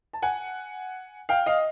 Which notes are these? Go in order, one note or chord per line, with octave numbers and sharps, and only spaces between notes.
A5
F#5 G#5
F5 G5
D#5 F5